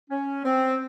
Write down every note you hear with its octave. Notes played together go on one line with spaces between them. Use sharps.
C#4
C4